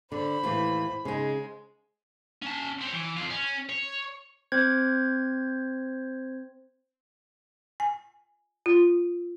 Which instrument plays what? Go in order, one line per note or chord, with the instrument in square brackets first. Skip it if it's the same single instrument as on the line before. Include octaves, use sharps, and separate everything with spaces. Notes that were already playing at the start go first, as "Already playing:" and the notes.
[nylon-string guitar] D3 [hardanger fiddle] C5 B5
[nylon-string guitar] D#2 A2 E3
[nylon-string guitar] C#3 D#4 [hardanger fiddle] G#3
[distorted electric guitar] C#4 A5
C4 C#5
E3
F2 F4
C#4
C#5
[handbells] C4 C5 G#6
[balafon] G#5
F4